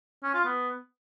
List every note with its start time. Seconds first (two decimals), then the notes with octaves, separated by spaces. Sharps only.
0.24 C#4
0.34 F4
0.45 B3